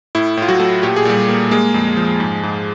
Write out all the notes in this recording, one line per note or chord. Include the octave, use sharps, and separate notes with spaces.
A2 E4
A2 F4
F#3 F#4
A3
A#2 G4
G#4
A#2 G3 G4
A#3
G#3 A#3 G#4
F2
F3
G#2
G#2